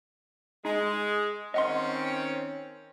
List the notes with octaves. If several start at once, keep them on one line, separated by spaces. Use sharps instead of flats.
G#3 D#4
D#3 C4 C#4 D#5 F#5 C6